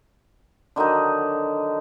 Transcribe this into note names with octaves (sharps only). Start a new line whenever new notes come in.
D3 D#3 F#3 D#4